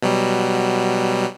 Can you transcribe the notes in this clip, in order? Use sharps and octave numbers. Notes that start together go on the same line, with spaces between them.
B2 F#3 G3